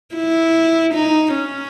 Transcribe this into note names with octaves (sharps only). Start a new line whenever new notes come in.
E4
D#4
C#4